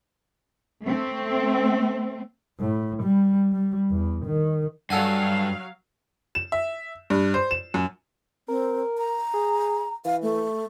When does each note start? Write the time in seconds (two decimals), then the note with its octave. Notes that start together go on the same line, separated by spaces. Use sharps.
0.83 A3 C4
2.59 A2
3.03 G3
3.53 G3
3.90 E2
4.26 D#3
4.90 G2 F#3 G3 A4 F5 F#5 G#5
6.35 E7
6.52 E5
7.10 G2
7.34 C5
7.51 E7
7.74 F#2
8.48 C4 A#4
8.98 A#5
9.34 G#4
10.05 E3 F5
10.22 A3